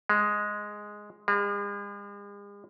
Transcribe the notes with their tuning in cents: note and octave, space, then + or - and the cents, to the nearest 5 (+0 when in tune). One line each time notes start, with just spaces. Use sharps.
G#3 +0
G#3 -45